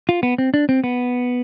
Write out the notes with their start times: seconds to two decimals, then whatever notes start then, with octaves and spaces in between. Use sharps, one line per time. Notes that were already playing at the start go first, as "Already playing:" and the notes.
0.09 F4
0.23 B3
0.38 C4
0.54 D4
0.69 C4
0.84 B3